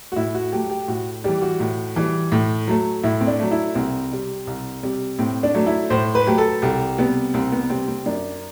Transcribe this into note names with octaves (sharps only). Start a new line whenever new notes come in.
F#4
A2 E4
F#4
F#3 A3 G4
G4
A2 F#4
E3 G3 G4
F#4
A2
E3 G3
A2
F#3 A3
A2 E4
C4
D4
F#3 A3
E4
C2 C4
C3 G3
C2
C3 G3
A2 C4
D4
F#3 A3
E4
A2 C5
B4
F#3 A3 G4
A4
C2 G4
C3 G3 B3
C2 C4
B3
C3 G3 C4
C4
F#2 D4